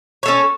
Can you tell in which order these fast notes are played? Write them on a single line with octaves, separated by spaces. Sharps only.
C#5 A4 C#4